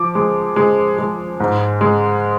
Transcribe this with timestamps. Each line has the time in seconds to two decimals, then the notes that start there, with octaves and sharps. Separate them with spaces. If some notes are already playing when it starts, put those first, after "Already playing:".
Already playing: F3 D6
0.15 G#3
0.56 G#3
0.99 G#3
1.40 G#2
1.81 G#3